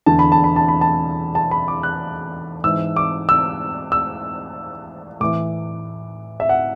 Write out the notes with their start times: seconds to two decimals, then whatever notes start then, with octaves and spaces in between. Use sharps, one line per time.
0.06 E2 D3 A5
0.19 B5
0.32 A5
0.44 B5
0.56 A5
0.69 B5
0.81 A5
1.35 A5
1.51 B5
1.68 D6
1.83 F#6
2.64 G#2 E3 E6
2.96 D6
3.29 E6
3.92 E6
5.20 A2 E3 D6
6.40 E5
6.49 F#5